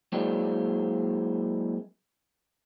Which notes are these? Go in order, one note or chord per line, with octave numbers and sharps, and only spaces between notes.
F#3 G#3 A#3 C4 D4 E4